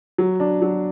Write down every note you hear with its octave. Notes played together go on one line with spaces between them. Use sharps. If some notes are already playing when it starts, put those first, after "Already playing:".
F#3
D4
F#3